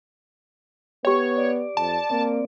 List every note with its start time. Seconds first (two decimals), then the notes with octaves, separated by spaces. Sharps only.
1.05 B3 G4 C#5 G5
1.37 D5
1.77 F2 A5
2.11 A#3 C4 D5